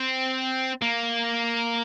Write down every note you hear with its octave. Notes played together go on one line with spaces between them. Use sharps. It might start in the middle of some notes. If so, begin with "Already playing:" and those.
Already playing: C4
A#3